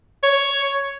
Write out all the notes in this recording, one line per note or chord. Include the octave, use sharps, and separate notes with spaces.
C#5